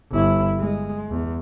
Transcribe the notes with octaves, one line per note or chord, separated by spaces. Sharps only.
G1 E4
G#3
E2